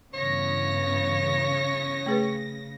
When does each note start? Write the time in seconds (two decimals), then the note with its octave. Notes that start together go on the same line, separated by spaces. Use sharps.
0.14 G2 C#3 E3 B3 C#5 A#6
2.06 A3 G#4 B4